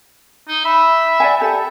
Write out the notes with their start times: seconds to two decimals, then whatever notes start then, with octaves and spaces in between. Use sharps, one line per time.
0.48 D#4
0.65 E5 B5
1.20 D5 F#5 G#5
1.41 G4 A4